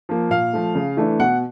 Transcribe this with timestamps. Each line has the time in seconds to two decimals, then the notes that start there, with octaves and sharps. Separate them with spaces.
0.09 F3 A#3
0.30 A#2 F5
0.53 F3 A3
0.75 C#3
0.97 E3 A3 D4
1.20 B2 F#5